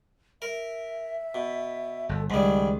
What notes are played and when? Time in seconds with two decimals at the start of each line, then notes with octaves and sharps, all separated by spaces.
0.42 A#4 E5
1.35 B2
2.09 G1 A4
2.30 C#2 G#2 D#3 G3 G#4